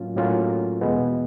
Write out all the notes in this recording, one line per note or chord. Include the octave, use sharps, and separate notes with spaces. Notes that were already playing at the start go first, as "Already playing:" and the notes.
Already playing: A2 F#3 A#3 C#4 F4
A2 F#3 A#3 C#4 F4
E2 B2 G#3 B3